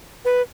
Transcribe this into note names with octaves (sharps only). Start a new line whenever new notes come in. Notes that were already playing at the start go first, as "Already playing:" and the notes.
B4